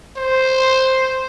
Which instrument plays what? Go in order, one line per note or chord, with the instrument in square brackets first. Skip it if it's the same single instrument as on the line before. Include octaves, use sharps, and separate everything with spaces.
[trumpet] C5